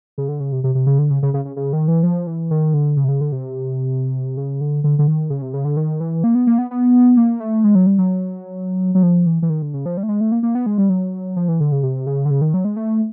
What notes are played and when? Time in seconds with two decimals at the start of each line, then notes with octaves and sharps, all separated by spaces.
0.18 C#3
0.28 D3
0.40 C#3
0.52 C3
0.64 C3
0.75 C3
0.87 C#3
0.98 D3
1.10 C#3
1.23 C#3
1.34 C#3
1.45 C#3
1.56 C#3
1.73 D#3
1.88 E3
2.03 F3
2.27 E3
2.51 D#3
2.74 D3
2.97 C#3
3.04 C3
3.08 C#3
3.21 D3
3.32 C3
4.37 C#3
4.61 D3
4.84 D3
4.99 D3
5.07 D#3
5.30 C#3
5.42 C3
5.54 C#3
5.65 D3
5.77 D#3
6.00 E3
6.24 A#3
6.35 B3
6.47 A#3
6.58 B3
6.71 B3
7.17 A#3
7.40 A3
7.64 G#3
7.75 F#3
7.86 G3
7.98 F#3
8.95 F#3
9.03 F3
9.26 E3
9.42 E3
9.50 D#3
9.62 D3
9.74 C#3
9.86 F3
9.97 G3
10.03 A3
10.09 G#3
10.21 A3
10.32 A#3
10.43 A#3
10.55 B3
10.66 G#3
10.78 G3
10.89 F#3
11.36 F3
11.48 E3
11.60 D3
11.72 C#3
11.83 C3
12.07 C#3
12.25 D3
12.31 C#3
12.41 D#3
12.54 F#3
12.65 G#3
12.76 A3